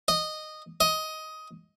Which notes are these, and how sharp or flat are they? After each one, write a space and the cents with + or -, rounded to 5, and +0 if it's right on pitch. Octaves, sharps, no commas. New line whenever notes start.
D#5 -10
D#5 +15